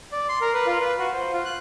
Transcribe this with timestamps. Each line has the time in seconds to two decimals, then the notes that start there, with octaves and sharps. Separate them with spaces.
0.12 D5
0.29 C6
0.41 A#4
0.54 B4
0.67 F4
0.81 B4
0.99 F#4
1.13 C5
1.33 F4
1.45 F#6